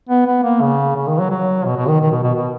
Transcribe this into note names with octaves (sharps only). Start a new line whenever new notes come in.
B3
B3
A#3
C#3
C#3
D#3
F#3
F#3
B2
B2
D#3
D#3
B2
B2
B2